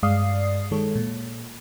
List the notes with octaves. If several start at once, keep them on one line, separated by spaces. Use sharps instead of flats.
G2 G#3 D5 F5 D#6 C7
D#3 G#3 A4 C#5
A#2